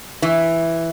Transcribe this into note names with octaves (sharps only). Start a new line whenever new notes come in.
E3